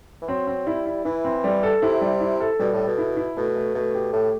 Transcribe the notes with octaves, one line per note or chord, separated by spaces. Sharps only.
E3
F#3 C4
C4
G3 E4
E4
E3 E4
C4
G3
A4
C3 E4
G3
E4
A4
B2 G3
A2
A4
B2
E4
E4
B2 A3
A3
B2 A3
G4
A2 A3